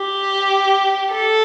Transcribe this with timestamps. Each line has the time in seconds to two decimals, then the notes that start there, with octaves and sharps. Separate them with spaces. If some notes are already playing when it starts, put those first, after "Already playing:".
Already playing: G4
1.13 A4